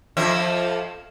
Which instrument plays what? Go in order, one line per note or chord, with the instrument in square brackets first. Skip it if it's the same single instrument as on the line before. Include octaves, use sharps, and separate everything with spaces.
[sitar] F2 F3 E5